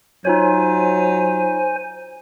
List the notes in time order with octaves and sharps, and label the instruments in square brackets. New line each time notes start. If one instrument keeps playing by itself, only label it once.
[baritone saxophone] F#3 [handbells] D#4 F4 C#5 [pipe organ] C5 G#5